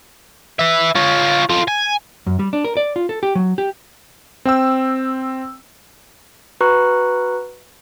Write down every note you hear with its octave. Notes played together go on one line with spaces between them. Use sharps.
B4 E5
F4 C#5
F4 A4
G#5
F#2
G3
D4
A#4
D5
F4
A4
G4
F#3
G4
C4 G5 E6
F#4 B4 A#5 C#6 F#6